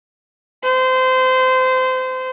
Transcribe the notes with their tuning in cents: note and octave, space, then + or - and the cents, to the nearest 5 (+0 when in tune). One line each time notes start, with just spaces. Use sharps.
C5 -25